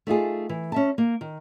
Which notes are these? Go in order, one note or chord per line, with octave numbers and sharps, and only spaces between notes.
A3 D#4 F4 G#4
E3
C#4 E5 A5
A#3
D#3